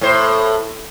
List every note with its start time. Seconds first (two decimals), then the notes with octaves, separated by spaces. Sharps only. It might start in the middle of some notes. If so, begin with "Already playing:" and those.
0.01 A2 C5